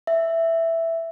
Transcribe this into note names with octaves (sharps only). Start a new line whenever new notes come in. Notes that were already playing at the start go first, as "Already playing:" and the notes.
E5